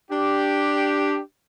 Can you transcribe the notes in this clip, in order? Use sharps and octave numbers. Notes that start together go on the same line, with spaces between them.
D4 G4